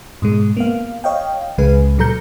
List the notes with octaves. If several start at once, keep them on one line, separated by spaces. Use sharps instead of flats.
G#2 B2 G#3
A#3 B3 F5
C#5 D#5 F5 G5
C#2 C#3 G#3 G#4 B4
A#2 F#3 A4 A#5 G6 C#7